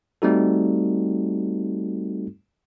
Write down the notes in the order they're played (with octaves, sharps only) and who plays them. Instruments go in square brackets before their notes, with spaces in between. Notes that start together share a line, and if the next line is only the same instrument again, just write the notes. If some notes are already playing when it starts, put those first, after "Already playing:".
[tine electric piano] G3 A3 C4 D#4 F#4 A4